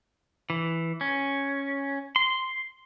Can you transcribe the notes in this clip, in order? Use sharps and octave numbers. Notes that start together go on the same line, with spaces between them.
E3
C#4
C6